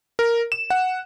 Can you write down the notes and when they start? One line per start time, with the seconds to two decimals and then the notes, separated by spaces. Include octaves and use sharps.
0.19 A#4
0.52 E7
0.70 F#5